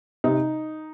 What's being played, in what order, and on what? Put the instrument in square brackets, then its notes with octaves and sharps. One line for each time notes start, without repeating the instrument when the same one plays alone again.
[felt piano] C3 D#4